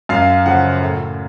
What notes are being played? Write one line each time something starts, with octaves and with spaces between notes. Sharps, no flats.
F#2 F5
C#3 F3 F#5
A2